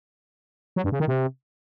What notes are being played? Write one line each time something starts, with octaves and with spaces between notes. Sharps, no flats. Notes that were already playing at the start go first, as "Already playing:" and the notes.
F#3
G2
C#3
D#3
C3